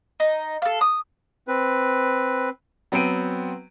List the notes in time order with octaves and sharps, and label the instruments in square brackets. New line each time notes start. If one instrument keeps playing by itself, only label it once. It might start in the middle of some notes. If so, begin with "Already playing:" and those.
[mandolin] D#4
A4 F5
D#6
[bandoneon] C4 B4
[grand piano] F#3 B3 C4 G5 D7 D#7